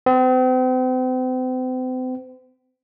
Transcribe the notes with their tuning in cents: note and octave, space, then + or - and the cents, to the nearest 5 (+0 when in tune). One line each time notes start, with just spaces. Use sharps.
C4 -40